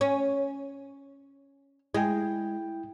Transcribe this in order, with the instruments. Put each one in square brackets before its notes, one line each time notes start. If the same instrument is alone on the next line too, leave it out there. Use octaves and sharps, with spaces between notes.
[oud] C#4
[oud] G#3 [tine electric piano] E4 G5